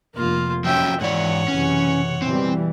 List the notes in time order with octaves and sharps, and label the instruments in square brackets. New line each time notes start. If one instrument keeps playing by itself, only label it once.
[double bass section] F1 [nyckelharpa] A#3 F4
[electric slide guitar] F3 F#3 C#4 [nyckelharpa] E5 G5
[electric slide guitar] G#2 D5 [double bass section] E3 [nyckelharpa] C#5 F#5
[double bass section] F#1 C3 E3 [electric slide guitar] C#4
[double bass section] B2 E3 G3 [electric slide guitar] C4